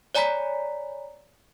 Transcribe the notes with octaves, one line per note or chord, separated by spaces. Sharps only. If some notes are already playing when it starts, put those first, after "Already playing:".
C#5 D5 G#5 A#5 B5 B6